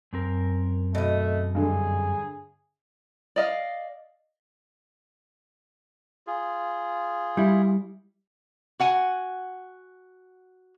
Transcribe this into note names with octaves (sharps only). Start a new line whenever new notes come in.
F#2 C4 A#4
B2 A3 D#5
G2 D3 G#4
D5 D#5 F5
F4 G#4
G3 E4
F#4 F#5 G#5